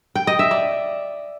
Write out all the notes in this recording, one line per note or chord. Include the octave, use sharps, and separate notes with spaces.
G5
D#5
E5
D5